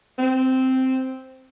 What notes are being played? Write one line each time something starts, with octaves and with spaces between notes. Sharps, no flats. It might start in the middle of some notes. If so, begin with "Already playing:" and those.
C4